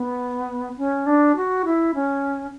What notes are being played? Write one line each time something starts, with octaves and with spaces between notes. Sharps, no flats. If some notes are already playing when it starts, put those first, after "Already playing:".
Already playing: B3
C#4
D4
F#4
E4
C#4